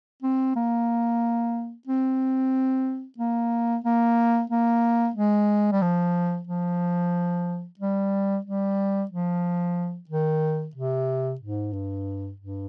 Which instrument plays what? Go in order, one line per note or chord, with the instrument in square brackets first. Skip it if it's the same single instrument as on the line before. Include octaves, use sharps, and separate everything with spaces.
[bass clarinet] C4
A#3
C4
A#3
A#3
A#3
G#3
G3
F3
F3
G3
G3
F3
D#3
C3
G#2
G2
G2